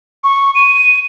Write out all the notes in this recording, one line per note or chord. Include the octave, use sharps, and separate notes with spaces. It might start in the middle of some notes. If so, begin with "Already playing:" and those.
C#6
D#7